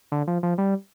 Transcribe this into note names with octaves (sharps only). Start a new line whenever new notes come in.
D3
F3
F3
G3